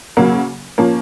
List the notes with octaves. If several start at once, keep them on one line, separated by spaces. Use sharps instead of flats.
C#3 F#3 A#3
F3 A#3 C#4